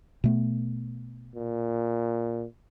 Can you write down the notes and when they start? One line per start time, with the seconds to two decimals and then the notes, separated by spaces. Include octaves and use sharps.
0.24 B2 A3 B3
1.35 A#2